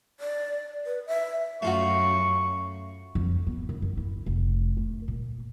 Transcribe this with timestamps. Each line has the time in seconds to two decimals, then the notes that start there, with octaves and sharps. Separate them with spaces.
0.20 D5
0.86 B4
1.07 E5
1.62 F#2 A3 F4 F#4 C#6
3.15 F2
3.47 B3
3.69 F#2
3.82 F#2
3.97 E4
4.26 F1
4.77 A3
5.08 A#2